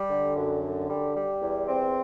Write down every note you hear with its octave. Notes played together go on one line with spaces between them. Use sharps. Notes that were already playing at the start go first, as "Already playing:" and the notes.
Already playing: G3
D3
F#2
D3
G3
G3
E2
C4